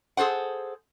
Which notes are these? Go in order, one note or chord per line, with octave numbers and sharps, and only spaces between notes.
G#4 A4 C5 F#5